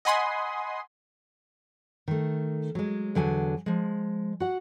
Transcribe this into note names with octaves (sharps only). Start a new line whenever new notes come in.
D#5 F#5 G#5 B5 C6 D#6
D#3 A3
F#3 G#3
E2 D3 F#3 G#5
F3 G#3
F#4 F#5